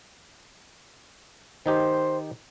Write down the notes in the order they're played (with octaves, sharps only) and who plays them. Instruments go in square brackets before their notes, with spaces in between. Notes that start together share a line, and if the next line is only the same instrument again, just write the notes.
[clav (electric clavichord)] D#3 D#4 G4 [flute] C5